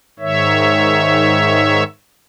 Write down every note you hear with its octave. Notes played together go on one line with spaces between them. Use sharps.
G#2 D#3 C#5 E5